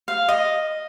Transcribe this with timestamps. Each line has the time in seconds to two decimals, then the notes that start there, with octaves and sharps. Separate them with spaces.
0.08 F5
0.29 D#5